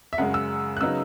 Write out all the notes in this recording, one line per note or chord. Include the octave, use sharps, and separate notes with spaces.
E5
F#2 C#3 G#3 F#5
E6
F#6
C#3 F#3 B3 D#4 E6